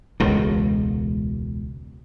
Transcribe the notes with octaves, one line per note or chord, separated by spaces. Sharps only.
E1 C#2 A2